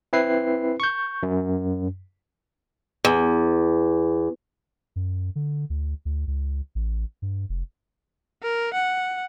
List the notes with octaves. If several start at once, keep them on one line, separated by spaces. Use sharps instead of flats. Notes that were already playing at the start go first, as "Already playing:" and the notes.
C4 E4 B4 C7
C#6 G6
F#2
E2
F#2
D3
D2
D2
C#2
A1
G2
F1
A#4
F#5